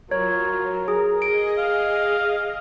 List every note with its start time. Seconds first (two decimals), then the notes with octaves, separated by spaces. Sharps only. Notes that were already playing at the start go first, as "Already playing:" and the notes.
0.11 F#3 F4 A#4 C#5
0.88 G#4
1.22 G#4 D#5 D7
1.58 F5